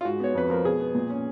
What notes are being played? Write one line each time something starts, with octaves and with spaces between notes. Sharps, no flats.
F4
G#2 F#4
B3 C#5
F2 B4
F3 A#4
B2 G#4
B3
A#2
C#4